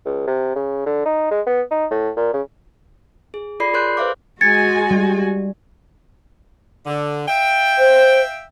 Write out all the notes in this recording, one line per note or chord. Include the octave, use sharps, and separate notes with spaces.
C#2
C3
C#3
D3
D#4
G#3
B3
D#4
A2
A#2
C#3
G#4
F4 A4 D5 B5 C7
G#4 A#4 C#5 C6 F#6 G6
B4 C5 E5 F5 D6
G#3 F#4 G#5 G#6 A6 C#7
G3
D3
E5 F5 G5
C5